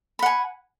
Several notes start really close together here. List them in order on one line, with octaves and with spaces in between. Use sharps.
B5 F#5 G#5